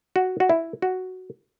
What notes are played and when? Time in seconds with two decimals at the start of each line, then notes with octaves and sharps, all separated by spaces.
0.16 F#4
0.40 F#4
0.49 E4
0.82 F#4